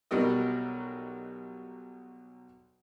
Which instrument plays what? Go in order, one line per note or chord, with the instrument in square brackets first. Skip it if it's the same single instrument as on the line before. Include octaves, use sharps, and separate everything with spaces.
[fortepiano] B1 B2 F#3 G3 A#4 D#5